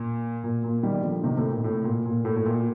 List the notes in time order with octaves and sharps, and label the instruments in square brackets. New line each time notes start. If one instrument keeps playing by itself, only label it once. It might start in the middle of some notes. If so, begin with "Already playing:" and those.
Already playing: [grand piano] A#2
A#2
A#2
D#3 G3
G3
D3 F3
C3 D#3
A2 C3
A#2
A2
A#2
A#2
A2
A2
A#2